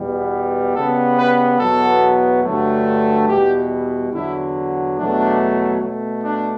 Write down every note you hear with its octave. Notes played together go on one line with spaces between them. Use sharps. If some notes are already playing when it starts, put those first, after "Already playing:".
Already playing: E2 B2 G3 B3
C#3 G3 B3 A4
B4
E2 B2 F#3 B3 A4
G2 D3 F#3 A3
E2 B2 G3 G4
E2 D3 F#3 E4
E2 B2 F#3 A3 D4
B2 A3
D4